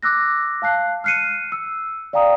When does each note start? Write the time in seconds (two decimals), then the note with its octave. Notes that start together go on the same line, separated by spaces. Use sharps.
0.03 D6 E6 F#6 A#6
0.62 F5 A5 F#6 C7
1.04 F6 F#6 C7 C#7 D#7
1.52 E6
2.13 D5 F5 G5 A#5 D#6